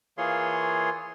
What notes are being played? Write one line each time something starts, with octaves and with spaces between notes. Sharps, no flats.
E3 A#3 F4 G#4 C#5 C6